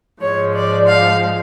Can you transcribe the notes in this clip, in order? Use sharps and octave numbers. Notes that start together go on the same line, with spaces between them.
G#2 F3 G#3 C#5
D5
F5